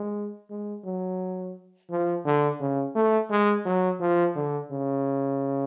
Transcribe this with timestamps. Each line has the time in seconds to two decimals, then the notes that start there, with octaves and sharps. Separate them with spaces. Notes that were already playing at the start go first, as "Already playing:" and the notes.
Already playing: G#3
0.50 G#3
0.85 F#3
1.91 F3
2.25 D3
2.61 C#3
2.95 A3
3.31 G#3
3.66 F#3
4.01 F3
4.36 D3
4.71 C#3